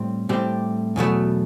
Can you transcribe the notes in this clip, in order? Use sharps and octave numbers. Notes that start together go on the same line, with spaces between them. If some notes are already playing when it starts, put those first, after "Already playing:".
Already playing: A2 G3 C4
A2 G3 C4 G4
E2 B2 F#3 A3